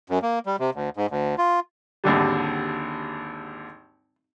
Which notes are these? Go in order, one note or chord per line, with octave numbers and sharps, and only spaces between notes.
F#2
A#3
G3
C3
D2
G#2
D2
F4
G#1 D#2 D3 G3